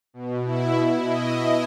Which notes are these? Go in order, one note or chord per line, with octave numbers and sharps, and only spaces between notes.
B2
E4
E4
D#5